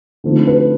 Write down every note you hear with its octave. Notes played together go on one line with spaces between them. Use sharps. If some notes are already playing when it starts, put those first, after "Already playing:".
D3 F3 A3 C4 D#4
B4